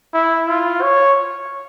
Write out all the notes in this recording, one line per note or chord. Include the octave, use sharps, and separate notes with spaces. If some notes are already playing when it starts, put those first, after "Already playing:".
E4
F4
C#5